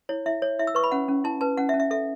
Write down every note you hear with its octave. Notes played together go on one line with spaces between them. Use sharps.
E4 C#5
E4 E5
C#5
E4 E5
E6
B4 C#6
B5
C#4 F#5
C#4
E4 A5
B4 A5
C#4 F#5
E5
C#4
E5
A4 E5